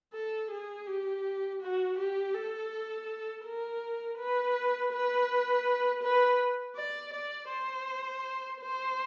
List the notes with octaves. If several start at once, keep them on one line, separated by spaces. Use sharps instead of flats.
A4
G#4
G4
F#4
G4
A4
A#4
B4
B4
B4
D5
D5
C5
C5